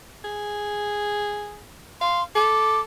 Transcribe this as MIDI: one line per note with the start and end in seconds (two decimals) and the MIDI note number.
0.24 1.64 68
2.01 2.23 77
2.01 2.23 84
2.35 2.84 69
2.35 2.81 86